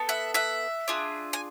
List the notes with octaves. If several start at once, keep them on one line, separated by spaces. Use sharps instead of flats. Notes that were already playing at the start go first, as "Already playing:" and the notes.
Already playing: B3 A4
E5 F#5
E5 F#5
D4 F4 G#4
G#5